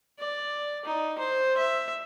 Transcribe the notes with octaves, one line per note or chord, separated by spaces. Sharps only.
D5
D#4
C5
E5